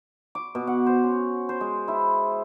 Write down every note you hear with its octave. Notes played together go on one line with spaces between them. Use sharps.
D6
B2
F#5
C5
C#4
C5
G#3
E4